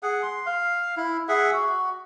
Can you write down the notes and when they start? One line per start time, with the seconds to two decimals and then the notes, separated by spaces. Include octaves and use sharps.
0.03 G#4 F#5
0.23 C6
0.46 F5
0.97 E4
1.28 G#4 E5 F#5
1.53 F#4